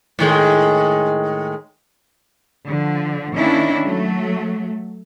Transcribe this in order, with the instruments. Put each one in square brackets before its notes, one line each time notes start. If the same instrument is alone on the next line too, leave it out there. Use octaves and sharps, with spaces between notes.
[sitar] A2 D#3 G#3
[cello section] D3 F3
D#3 A#3 C#4 D4 E4
F#3 A3